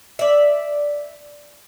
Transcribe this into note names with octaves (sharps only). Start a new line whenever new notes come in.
D5 E5